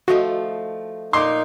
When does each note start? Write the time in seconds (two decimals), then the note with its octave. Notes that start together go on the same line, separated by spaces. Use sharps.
0.08 F3 A3 D#4 F#4 D#5
1.13 A#2 D#4 A#4 C6 D6